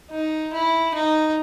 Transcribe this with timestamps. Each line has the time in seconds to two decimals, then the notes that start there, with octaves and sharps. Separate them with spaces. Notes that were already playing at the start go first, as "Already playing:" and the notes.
0.11 D#4
0.53 E4
0.95 D#4